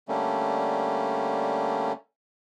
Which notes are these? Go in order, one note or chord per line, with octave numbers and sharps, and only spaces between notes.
D3 G3 A3 A#3 C#4